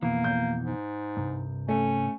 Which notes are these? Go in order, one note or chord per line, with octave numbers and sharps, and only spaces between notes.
F2 B2 E3 A#3
G6
G#2
C2 G2
A3 C#4